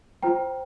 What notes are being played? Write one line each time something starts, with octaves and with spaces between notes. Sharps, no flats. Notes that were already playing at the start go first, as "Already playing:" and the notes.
F4 C5 G5 A#5